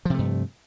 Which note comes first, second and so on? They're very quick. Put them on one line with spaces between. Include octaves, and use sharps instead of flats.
F3 C3 A3 G2